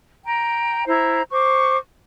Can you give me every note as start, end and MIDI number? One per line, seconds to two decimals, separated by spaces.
0.24 0.85 79
0.24 0.85 82
0.87 1.22 64
0.87 1.22 72
0.87 1.22 82
1.31 1.77 72
1.31 1.77 85
1.31 1.77 86